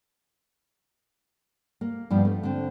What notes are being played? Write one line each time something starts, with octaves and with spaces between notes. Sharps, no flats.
A#3
G2 F3 B3
A3
D3 C4